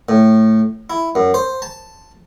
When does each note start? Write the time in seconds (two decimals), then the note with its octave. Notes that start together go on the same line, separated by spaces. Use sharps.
0.09 A2
0.90 E4
1.15 F#2
1.34 C5
1.62 A5